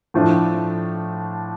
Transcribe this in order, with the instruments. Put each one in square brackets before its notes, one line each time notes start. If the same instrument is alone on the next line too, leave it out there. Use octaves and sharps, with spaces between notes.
[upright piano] A2 F3 A3 D4